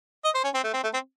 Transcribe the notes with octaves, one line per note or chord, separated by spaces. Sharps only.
D#5
C5
C#4
C4
A3
C4
A3
C4